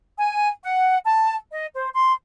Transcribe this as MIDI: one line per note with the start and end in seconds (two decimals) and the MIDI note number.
0.18 0.48 80
0.63 0.98 78
1.04 1.36 81
1.51 1.66 75
1.75 1.89 72
1.93 2.12 84